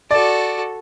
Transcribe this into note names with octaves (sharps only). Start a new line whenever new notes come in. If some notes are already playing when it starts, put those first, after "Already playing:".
F#4 A4 D5